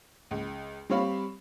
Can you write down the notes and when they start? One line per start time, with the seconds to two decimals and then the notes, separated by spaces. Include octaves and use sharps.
0.31 C#2
0.90 G3 C4 C#5 F5 B5